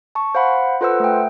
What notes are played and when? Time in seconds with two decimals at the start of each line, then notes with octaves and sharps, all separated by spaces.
0.15 A5 C#6
0.35 C5 F5 F#5 B5
0.81 F4 A4 B4 C5 F#5 E6
1.00 A3 G5